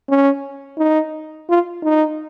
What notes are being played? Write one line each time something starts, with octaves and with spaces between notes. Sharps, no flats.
C#4
D#4
F4
D#4